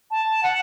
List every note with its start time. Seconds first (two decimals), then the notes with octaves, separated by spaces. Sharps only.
0.11 A5
0.43 F#5